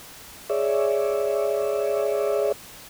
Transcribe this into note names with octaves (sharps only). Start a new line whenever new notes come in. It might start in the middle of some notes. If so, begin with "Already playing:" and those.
G#4 C#5 D5 E5